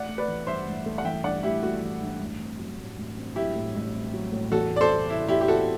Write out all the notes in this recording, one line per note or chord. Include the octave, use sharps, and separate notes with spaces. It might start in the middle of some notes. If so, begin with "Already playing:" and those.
Already playing: A1 D5 F#5
A3
B4 D5
E3
G2 C5 E5
A1
A3
F#5
E3 E5 G5
G2 D5 F#5
A1 E4 G4
A3 F#4
E3
G2
A1
C4
F#3
A2
A1
C4
F#3 E4 G4
A2
A1
C4
F#3
A2
E2 F#4 A4
A3
D5
A4 C5
E3
C3 E4
E2 E4 G4
G4
A3 F#4 A4